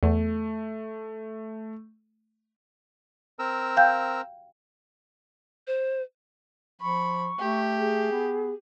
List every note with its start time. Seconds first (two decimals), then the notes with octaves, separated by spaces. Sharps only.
0.03 E2 A3
3.39 C4 A#4 E6
3.77 F5 G5 G6
5.67 C5
6.81 F3 B5 C#6
7.39 A3 G4
7.79 G#4
8.12 B3